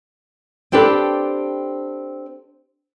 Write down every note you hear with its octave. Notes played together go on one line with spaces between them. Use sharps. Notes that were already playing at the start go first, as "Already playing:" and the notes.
C4 D4 G4 A4 B4